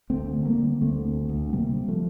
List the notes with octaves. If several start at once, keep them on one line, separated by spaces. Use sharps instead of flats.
D2 A3 C4
D3
G3 A#3
D3
D2 A3 C4
D2
D2
C3 G3 A#3
C3
F3 A3